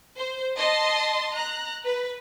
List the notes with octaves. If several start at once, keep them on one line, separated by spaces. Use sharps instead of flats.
C5
D#5 A5 C6
A#5 F#6
B4